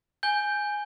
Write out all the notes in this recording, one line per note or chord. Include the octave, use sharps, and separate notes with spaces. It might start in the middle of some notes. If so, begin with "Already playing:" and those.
G#5 G6 G7